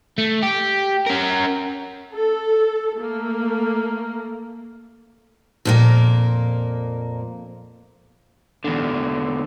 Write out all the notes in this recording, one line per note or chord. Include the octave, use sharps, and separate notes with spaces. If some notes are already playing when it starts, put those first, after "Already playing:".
A3
G4
C#4 A#4
A4
A3 A#3
F2 A#2 A#3
E2 D3